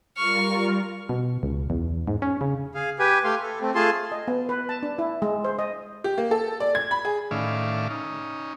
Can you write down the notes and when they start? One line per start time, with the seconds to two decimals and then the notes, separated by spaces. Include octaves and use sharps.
0.17 G3 F4 A#4 C#6 F6
1.09 B2
1.43 C#2
1.70 E2
2.07 G#2
2.22 C#4
2.41 C#3
2.75 G#4 F5
2.99 G4 B4 G#5
3.24 A3 G4 F5 C6
3.42 A4
3.61 A3 C4
3.75 A3 F4 G#4 A5 C6
4.12 D#5
4.28 B3
4.49 B4
4.69 A5
4.83 D4
4.98 E4
5.22 G#3
5.44 C5
5.59 D#5
6.04 G4
6.18 A#3
6.31 A4
6.60 D5
6.75 G#6
6.91 B5
7.05 G#4
7.31 A2 D#3 C#4 D5 E5 F5
7.90 C#4 D#4